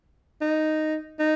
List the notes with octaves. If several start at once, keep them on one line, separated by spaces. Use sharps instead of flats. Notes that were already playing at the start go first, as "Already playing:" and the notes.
D#4
D#4